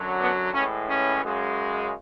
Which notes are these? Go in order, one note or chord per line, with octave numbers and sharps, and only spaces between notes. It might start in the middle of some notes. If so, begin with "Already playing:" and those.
Already playing: F#2 D3 F#3
B3 D4
A2 E3 G#3 C#4
C#4
F#2 C#3 G#3